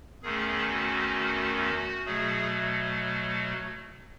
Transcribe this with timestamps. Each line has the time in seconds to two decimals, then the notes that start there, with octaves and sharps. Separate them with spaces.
0.23 E2 D#3 A3 C#4 G#4
0.68 F#4
1.60 F#4
2.06 B2 F#3 A3 G#4